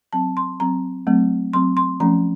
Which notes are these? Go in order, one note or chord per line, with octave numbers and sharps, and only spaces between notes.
F#3 C4 A5
C6
F#3 C4 A#5
F#3 A3 C4
F#3 C4 C6
C6
F3 A3 C#4 A#5